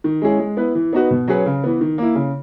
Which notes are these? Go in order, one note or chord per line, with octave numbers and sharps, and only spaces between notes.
D#3
G#3 C#4 E4 G#4
G#3
B3 E4 B4
E3
B3 D#4 F#4 B4
B2
F#3 C#4 G#4 B4
C#3
E3 B3
D#3
A#3 E4
C#3